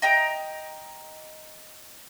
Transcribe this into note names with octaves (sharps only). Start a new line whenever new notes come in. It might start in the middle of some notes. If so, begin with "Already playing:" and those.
D#5 G5 A#5